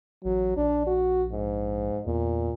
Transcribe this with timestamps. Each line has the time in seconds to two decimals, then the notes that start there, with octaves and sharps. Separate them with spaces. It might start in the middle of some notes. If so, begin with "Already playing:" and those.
0.25 A1 F#3
0.57 A#1 D4
0.87 F#4
1.32 G#2
2.06 E2 A#2